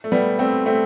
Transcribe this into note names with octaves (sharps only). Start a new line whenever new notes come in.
A3
G3 B3
A3 C4
A3 C4